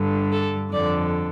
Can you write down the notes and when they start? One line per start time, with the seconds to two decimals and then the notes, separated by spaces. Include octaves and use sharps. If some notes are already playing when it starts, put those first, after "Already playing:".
Already playing: G2 D3
0.32 A4
0.72 F2 D3 D5